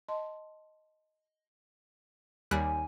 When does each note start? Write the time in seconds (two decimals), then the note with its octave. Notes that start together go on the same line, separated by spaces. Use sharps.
0.08 D#5 A5 C6
2.51 D#2 G3 D#4 C#5 G#5 F#6